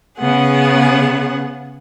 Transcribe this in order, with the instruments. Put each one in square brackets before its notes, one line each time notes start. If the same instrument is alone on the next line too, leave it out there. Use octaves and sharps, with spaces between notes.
[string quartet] C#3 B3 G#4 F#5